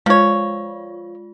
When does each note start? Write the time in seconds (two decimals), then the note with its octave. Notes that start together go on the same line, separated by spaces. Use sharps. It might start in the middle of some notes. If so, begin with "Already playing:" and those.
0.06 F3 G#3 F4 C#5